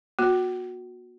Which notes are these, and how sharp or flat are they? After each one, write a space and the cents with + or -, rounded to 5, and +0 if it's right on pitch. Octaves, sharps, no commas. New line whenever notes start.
B3 -45 F#4 -25